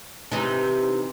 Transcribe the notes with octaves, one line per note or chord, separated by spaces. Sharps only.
C3 E3 D#4